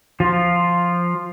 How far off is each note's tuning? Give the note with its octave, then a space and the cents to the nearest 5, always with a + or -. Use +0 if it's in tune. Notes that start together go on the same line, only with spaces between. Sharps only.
F3 +0 F4 +0